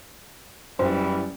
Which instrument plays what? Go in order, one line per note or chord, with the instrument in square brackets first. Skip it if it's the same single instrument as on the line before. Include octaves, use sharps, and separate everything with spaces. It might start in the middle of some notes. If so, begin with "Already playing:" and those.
[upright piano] F#1 [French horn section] E2 E3 G3 [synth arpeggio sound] C5